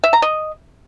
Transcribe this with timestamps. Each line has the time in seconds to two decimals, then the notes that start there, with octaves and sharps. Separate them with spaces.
0.04 E5
0.13 A#5
0.22 D#5